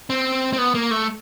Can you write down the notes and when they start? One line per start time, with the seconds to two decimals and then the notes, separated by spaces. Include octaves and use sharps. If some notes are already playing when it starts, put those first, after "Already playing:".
0.10 C4
0.53 C4
0.58 B3
0.74 A#3
0.91 A3